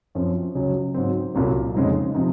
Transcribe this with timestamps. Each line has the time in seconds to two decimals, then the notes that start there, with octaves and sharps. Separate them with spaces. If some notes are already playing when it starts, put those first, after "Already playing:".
0.15 F#2 F3 C4
0.55 C#2 C#3 F#3
0.94 G#2 F#3 C4
1.35 C2 A#2 F#3
1.74 F2 C#3 G#3 C4 D#4
2.14 C3 F3 C4 D#4